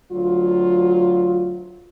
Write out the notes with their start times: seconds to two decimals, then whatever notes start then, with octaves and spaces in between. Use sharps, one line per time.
0.12 D2 F#3 F4